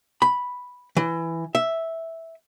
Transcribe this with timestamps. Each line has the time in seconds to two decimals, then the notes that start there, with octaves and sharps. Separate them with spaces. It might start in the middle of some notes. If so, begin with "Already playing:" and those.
0.22 B5
0.97 E3
1.55 E5